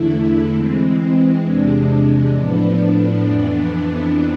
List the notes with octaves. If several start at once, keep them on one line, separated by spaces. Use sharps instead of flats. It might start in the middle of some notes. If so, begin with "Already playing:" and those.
Already playing: E2 D3 A3 E4
E3 G#3 C4
E2 C3 G#3 D4
A2 F3 B3 D4
F2 E3 B3 D4